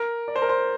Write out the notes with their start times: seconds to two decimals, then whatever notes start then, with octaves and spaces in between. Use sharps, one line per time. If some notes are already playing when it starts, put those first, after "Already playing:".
Already playing: A#4
0.28 D5
0.36 C5
0.42 A#4
0.49 C5